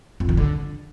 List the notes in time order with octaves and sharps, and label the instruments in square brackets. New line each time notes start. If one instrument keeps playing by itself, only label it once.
[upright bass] F2
D#3
D3